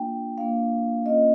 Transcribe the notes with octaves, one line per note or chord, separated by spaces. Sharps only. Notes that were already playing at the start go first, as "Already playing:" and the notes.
Already playing: A#3 D4 F4 G5
A#3 D4 F4 F5
A#3 C#4 F4 D#5